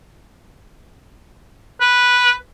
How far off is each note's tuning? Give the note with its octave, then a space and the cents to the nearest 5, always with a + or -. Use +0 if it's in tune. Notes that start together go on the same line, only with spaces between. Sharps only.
B4 -5